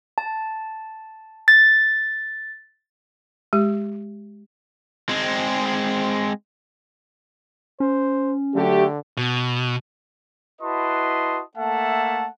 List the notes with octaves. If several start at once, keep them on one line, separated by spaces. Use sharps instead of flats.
A5
A6
G#3 G4
G#3 C4
C#4 C5
D3 F#3 A3 G4
B2
E4 F#4 B4 D#5 A5 C6
A3 A#3 A4 E5 F#5 A5